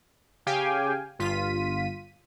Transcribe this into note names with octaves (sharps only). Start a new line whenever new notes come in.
C#3 G4 F5 G5 G#5
G1 F4 B6 D#7